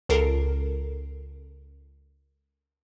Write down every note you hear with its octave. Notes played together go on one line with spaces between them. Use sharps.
C#2 A4 A#4 C7 D7